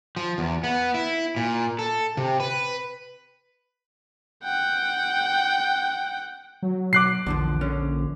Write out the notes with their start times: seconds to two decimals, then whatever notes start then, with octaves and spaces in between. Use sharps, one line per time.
0.17 F3
0.38 E2
0.64 B3
0.94 E4
1.36 A#2
1.79 A4
2.17 C3
2.40 B4
4.44 F#5 G5
6.62 F#3
6.93 B1 D6 F#6 C7
7.26 A#1 E2 D3 F3
7.61 D3 C#4